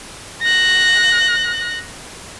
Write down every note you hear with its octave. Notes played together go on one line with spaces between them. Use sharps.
F#6 A#6